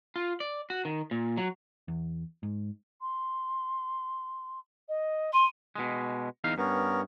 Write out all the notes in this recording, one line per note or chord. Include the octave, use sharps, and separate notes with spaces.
F4
D5
F#4
D#3
A#2
F#3
E2
G#2
C6
D#5
C6 D#7
B2 G#3
E2 D#4 F5
G2 B3 C#4 A#4